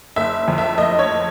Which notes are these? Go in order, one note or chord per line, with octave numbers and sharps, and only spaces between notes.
F#1 E5
F2
E5
F#1 D#5
C#5